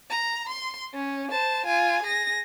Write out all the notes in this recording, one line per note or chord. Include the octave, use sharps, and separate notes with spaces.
A#5
C6
C#4
C5 A5
F4 G#5
G#4 A#6